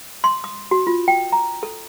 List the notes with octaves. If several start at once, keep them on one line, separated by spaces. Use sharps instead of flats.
C6
D#6
F#4
F4
G5
A#5
A4